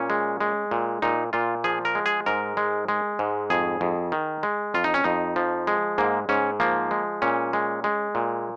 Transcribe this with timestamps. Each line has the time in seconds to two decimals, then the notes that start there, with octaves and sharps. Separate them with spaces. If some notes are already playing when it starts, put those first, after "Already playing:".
Already playing: A#2 C#4
0.10 G#3
0.40 G#3
0.71 A#2
1.02 A#2 D#4
1.33 A#2 F4
1.64 F3 G#4
1.85 A#4
1.95 G#3
2.06 G#4
2.26 G#2 A#4
2.57 G#3
2.88 G#3
3.19 G#2
3.50 F2 G#4
3.81 F2
4.12 D#3
4.43 G#3
4.74 F2 F4
4.84 D#4
4.94 C#4
5.04 F2 D#4
5.36 F3
5.67 G#3
5.98 G#2 A#3
6.29 G#2 C#4
6.60 F3 A#3
6.91 G#3
7.22 A#2 C#4
7.53 G#3
7.84 G#3
8.15 A#2